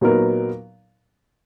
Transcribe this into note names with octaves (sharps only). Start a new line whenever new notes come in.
A#2 F#3 B3 D#4 A#4